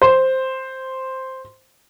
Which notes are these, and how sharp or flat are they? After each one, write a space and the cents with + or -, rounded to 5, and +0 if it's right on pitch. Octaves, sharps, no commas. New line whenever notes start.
C5 +0